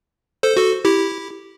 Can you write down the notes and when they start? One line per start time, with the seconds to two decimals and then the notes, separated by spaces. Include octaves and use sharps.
0.43 A4 C5
0.57 F#4 A4
0.85 E4 G4